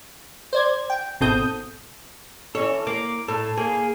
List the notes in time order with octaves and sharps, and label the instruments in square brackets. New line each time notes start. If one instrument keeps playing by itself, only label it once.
[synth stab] C5 D5 G#6
G5
G#1 B2 C4 A4 D#6 G6
[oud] E3 C#4 C#5 [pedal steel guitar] A4
[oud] A#3 [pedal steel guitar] D6
[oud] A2 [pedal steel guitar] A4
[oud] A#3 [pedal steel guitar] G#4